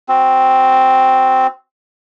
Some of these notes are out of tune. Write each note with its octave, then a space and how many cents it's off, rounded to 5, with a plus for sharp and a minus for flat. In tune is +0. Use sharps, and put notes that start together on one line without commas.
C4 +0 F#4 +0